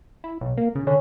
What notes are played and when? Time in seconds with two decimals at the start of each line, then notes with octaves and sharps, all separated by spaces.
0.24 E4
0.41 B1
0.58 A#3
0.75 C#3
0.87 D3 C#4